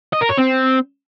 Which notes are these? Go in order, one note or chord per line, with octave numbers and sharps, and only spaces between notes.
D#5
A#4
C#5
C4